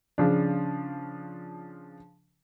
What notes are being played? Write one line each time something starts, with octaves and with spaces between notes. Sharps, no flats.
C#3 F3 D4